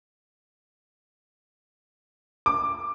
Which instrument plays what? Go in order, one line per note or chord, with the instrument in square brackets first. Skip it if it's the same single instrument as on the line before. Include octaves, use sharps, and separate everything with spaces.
[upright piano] D6